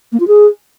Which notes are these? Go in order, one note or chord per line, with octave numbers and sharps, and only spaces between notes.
A#3
F4
G#4